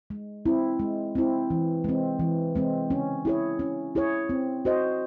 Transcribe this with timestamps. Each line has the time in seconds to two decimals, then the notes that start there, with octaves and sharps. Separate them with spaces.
0.10 G#3
0.46 C4 E4
0.79 G#3
1.15 C4 E4
1.50 E3
1.84 G#3 C4
2.20 E3
2.55 G#3 C4
2.90 C#4
3.25 E4 G#4 C#5
3.59 C#4
3.95 E4 G#4 C#5
4.29 C4
4.65 F#4 C5 D#5